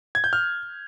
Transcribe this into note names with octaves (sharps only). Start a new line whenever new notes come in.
G#6
G6
F6